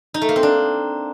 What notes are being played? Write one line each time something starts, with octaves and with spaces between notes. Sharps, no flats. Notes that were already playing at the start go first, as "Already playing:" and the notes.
D#4
A3
A#3
C4
D4